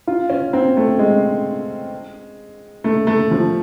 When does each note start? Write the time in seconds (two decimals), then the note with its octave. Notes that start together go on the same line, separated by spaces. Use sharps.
0.07 F4
0.30 C#4
0.53 C4
0.77 A3
0.99 G#3
2.84 A3
3.07 A3
3.31 F3